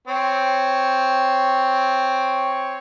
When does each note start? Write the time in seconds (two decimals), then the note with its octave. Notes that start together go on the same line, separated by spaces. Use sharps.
0.08 C4 C#5